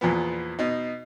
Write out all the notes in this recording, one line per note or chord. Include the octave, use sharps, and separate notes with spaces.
E2 A#2 F3 B3
B2 D#4